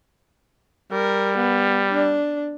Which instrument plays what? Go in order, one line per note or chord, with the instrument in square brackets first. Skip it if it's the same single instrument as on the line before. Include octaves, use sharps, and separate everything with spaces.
[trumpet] G3 [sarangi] A#4
[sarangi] B3
D4